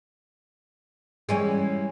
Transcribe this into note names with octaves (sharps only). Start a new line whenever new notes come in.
E3 G3 G#3 C#4